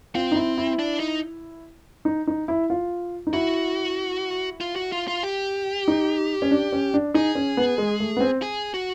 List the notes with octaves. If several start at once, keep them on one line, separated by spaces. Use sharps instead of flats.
C4 F4
D#4
E4
E4
D4
D#4
D#4
D#4
E4
F4
D#4
E4 F#4
F4
F#4
F4
F4
G4
D#4
C#4
D4
C#4
D4
D#4 G#4
C#4
B3
G#3
A3
B3
C4
G#4
F#4